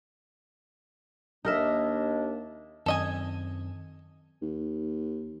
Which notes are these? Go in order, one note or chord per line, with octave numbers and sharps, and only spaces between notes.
D#2 A#3 D4 D#4 A#4 D#5 E5
F#2 D#3 C4 A4 D#5 G#5
D#2